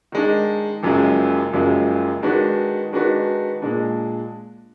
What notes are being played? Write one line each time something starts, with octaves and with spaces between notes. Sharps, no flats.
D#3 G#3 D4
F#1 F#2 F3 G#3
F#1 F#2 F3 G#3
D#3 G#3 D4 F#4 B4
D#3 G#3 D4 F#4 B4
A#2 G#3 D4